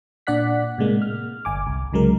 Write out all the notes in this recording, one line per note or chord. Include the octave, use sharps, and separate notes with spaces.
A#2 D4 D5 F#5 F#6 B6
A2 C3 G#3 A#3
F6
G1 G#5 D6
C2
C2 C#3 F#3 G#3 A#4